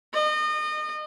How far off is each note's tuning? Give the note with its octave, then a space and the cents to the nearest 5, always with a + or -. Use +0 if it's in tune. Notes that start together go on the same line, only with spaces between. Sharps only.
D#5 -30